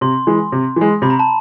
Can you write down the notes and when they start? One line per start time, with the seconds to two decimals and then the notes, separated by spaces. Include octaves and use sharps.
0.01 C3 C6
0.27 E3 G#3
0.52 C3
0.76 E3 G#3
1.02 C3 B5
1.10 A#5
1.19 A5